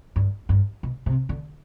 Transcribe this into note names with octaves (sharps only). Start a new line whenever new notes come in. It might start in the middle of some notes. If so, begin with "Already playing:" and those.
G2
G2
B2
C3
D3